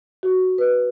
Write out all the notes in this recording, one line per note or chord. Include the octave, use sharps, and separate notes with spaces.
F#4
B4